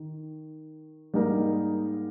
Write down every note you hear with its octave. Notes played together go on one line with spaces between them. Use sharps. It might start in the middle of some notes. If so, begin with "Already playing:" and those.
Already playing: D#3
G#2 G3 A#3 D#4 A#4